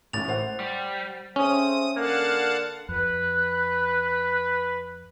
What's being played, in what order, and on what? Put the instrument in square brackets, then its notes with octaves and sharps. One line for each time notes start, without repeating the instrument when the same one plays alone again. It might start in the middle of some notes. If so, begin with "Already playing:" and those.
[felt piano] A1 A2 [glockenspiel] A6 F7
[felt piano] C5 F#5
[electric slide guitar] G3
[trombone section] C#3 A3 C4 [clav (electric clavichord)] C#4 [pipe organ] D#6
[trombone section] D3 [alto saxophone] A#3 [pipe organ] F5 F#5 A5
[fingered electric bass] F2 [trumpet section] B4 [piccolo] F#6